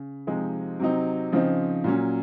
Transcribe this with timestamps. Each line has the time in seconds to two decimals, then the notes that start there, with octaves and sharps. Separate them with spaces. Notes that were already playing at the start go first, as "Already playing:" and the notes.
Already playing: C#3
0.27 C3 F3 G#3 D#4
0.79 C3 F#3 C4 D#4
1.32 C#3 F3 C4 D#4
1.84 A#2 F#3 C#4